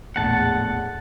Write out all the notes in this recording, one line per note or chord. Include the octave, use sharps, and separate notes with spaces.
A#1 E2 A2 F#5 A5